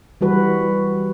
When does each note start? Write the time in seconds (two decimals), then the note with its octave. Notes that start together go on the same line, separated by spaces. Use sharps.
0.21 E3 G3 F#4 B4